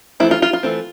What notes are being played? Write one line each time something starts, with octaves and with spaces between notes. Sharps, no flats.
E3 A3 C4 E4
F4
F4
F4
E3 A3 C4